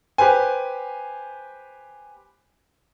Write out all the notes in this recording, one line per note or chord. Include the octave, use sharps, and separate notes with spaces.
G4 B4 C5 G#5